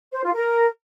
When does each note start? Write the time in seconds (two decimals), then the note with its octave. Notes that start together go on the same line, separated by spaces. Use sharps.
0.13 C5
0.24 F4
0.35 A#4